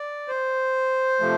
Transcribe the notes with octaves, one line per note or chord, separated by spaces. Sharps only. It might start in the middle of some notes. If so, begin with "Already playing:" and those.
Already playing: D5
C5
C3 F3 A3